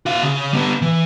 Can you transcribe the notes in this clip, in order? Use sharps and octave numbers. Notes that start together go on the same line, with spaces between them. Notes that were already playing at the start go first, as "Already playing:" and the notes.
F#4 F5
C#3
G3 B3
E3